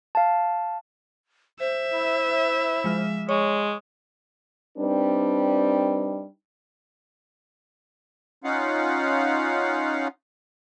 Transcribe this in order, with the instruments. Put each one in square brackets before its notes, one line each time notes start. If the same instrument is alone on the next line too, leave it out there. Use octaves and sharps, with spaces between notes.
[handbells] F5 A5
[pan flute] C5 [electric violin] E5
[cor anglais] E4
[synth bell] F3 G#3 F6
[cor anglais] G#3 [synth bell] C#5 [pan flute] C#6
[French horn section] G3 C4 D4 D#4 B4
[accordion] C#4 D#4 F4 F5 F#5